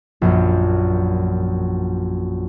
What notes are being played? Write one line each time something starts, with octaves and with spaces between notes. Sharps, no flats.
A#1 F#2